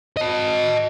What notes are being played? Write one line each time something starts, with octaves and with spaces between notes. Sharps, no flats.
D#5 A5